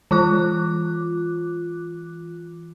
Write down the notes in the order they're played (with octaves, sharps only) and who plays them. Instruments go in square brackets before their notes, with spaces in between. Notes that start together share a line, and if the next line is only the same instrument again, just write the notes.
[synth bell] E3 F4 D6 F#6